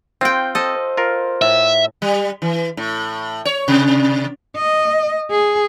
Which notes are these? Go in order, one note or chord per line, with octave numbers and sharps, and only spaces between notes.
C4 F4 G5
A4 C5 D#5
F4 A#4
A2 E5
G3
E3
A2
C#5
C3
D#5
G#4